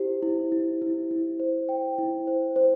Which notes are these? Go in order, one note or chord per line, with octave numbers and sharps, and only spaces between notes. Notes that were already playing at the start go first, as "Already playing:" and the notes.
Already playing: E4 G4 C5
E4
E4
E4
E4
C5
G5
E4
C5
C5